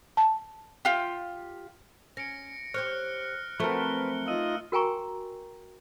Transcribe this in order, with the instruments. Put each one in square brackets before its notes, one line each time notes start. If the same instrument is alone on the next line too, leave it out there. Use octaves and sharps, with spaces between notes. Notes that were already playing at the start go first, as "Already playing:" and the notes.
[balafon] A5
[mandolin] F4 G4
[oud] C#4 [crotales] A#6 C#7 D7
[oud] G4 C5 C#5 [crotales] F6 F#6 C#7
[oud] F3 F#3 C4 [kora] A3 A#4 [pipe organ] B4 [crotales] G7
[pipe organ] D#4 F4 D#5 [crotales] E6 D#7
[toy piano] F#4 A#4 G5 G#5 A#5 C#6